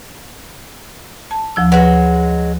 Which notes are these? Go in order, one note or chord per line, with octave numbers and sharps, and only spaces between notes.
A5
D2 F3 E6
F#3 G#3 B4